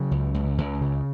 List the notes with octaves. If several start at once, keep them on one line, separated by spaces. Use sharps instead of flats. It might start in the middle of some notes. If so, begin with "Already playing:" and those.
Already playing: C#3 F#3
C#2
C#2
C#2
C#3